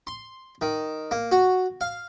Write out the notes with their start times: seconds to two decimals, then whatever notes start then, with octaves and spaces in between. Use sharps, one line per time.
0.07 C6
0.62 D#3
1.11 A#3
1.32 F#4
1.81 F5